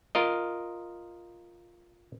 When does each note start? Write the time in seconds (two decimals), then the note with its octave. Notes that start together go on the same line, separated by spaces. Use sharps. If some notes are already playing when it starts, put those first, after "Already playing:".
0.15 F4 A#4 D#5